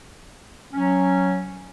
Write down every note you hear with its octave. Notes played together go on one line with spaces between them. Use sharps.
F#3 C#4